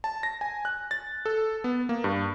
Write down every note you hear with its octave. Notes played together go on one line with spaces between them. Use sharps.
A5
A#6
G#5
F#6
A6
A4
B3
A#3
G2